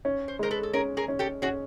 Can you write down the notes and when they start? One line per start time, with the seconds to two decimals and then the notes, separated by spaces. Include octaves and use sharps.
0.05 C#4
0.28 C5
0.39 G#3 A#4 C5
0.51 A4 B4
0.63 A4
0.73 C#4 G#4 A#4
0.97 G#4 A#4
1.08 C#4
1.19 G4 A4
1.42 C#4 F#4 G#4